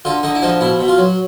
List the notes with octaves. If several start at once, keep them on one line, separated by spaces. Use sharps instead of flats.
D3 F4
D3 D#4
E4
F3 D#4
B2 E4
B2
F4
F#3